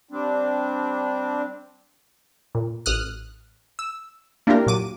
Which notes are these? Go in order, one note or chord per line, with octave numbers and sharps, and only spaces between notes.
G3 C4 D4
A#2
A1 D#6 F6 F#6
E6
A#3 D4 E4 F4 G4 A#4
A#2 F#3 D6 D#7